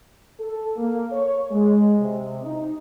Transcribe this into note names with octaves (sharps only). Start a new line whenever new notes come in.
A4
A#3
C#5
G#3
C3
D#4